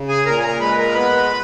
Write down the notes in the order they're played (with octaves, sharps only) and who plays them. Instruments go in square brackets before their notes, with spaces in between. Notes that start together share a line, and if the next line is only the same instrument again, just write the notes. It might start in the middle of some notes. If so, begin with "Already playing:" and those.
Already playing: [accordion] C#3
G#4 G#5
A#2 A#4 A#5
G#5
A#4 A#5
G#3 B4 B5
A#4 A#5
B3 B4 B5